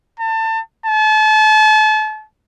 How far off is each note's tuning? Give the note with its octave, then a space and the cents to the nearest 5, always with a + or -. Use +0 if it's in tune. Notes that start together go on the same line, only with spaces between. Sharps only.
A5 +30
A5 -35